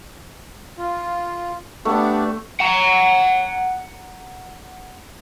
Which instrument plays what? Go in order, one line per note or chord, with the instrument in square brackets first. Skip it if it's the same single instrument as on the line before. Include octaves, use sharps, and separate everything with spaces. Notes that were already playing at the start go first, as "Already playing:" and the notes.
[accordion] F4
[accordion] G3 B3 D4 [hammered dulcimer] A3
[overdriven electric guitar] F#5 A#5